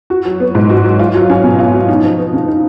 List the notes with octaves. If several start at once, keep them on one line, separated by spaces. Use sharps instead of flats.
F#4
F#3
B3
G#2
F#4
F#3
F4
F#3
C#4
B2
F4
F#3
D#4
F3
B3
C#3
D#4